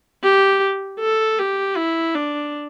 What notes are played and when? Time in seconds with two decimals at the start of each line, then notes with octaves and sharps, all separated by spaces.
0.24 G4
1.00 A4
1.39 G4
1.76 E4
2.15 D4